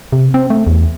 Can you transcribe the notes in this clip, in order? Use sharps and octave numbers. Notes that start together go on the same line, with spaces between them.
C3
C4
A3
E2